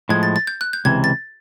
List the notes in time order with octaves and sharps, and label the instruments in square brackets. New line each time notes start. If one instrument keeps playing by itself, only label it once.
[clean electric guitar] A2 F3 G#3 [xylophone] G#6
[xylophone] A6
A6
G6
F#6
G6
[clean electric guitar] C#2 C3 E3 [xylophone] G#6
[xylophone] A6